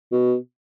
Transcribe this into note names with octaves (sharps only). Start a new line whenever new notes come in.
B2